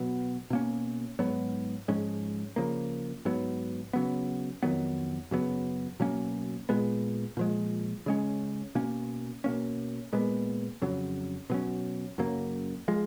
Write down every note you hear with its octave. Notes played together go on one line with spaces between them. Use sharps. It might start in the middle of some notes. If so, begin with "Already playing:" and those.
Already playing: B2 F#3 B3
B2 A#3 C#4
G#2 F#3 B3
G#2 F3 G#3 C#4
C#3 F3 A#3
G#2 F#3 B3
C#3 F#3 B3
F2 D#3 F#3 B3
F#2 C#3 F#3 B3
B2 F#3 A#3 C#4
A#2 G#3 B3
A#2 F3 G#3
C#3 G#3 C#4
B2 A#3 C#4
B2 A#3 C#4
A#2 G#3 B3
F2 C#3 F#3
B2 F#3 C#4
F#2 C#3 F#3 A#3
F3 G#3